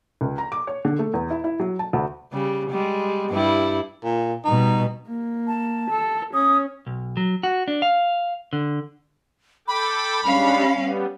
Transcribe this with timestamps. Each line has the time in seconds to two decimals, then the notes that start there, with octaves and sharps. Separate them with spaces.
0.21 C#2
0.38 A#5
0.52 D6
0.67 C#5
0.85 D3
0.99 A3
1.13 E2
1.30 E4
1.44 E4
1.60 F#3
1.79 A5
1.93 D2
2.33 C#3 G3
2.70 G3 G#3
3.30 G2 G3 E4
4.04 A#2
4.45 B2 G3 D#4
5.08 A#3
5.47 A5
5.91 A4
6.34 C#4 D#6
6.87 B1
7.17 F#3
7.43 F#4
7.68 D4
7.82 F5
8.53 D3
9.68 A4 G5 B5 D6
10.24 G3 G#3 C#4 D4 F5
10.73 G3 B3